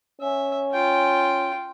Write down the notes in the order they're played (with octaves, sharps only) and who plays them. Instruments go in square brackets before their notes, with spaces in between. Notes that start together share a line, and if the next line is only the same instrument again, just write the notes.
[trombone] C#4 [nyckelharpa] E5
[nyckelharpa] F4 G5